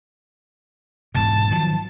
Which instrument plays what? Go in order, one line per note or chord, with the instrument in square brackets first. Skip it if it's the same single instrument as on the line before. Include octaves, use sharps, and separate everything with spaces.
[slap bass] E1 G#2 B2 [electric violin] A5
[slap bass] D#3 F3 F#3